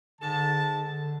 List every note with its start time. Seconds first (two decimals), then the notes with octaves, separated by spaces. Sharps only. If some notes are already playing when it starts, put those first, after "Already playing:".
0.21 G#2 D3 A5
0.71 D3